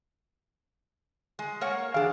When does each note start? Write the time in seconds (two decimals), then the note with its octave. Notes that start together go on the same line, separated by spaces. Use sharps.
1.39 G#3
1.61 A#3 C#5 F#5
1.94 E3 D4 G#4 F5